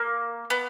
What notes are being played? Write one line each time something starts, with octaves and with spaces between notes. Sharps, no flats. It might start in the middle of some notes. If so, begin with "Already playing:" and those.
Already playing: A#3
B3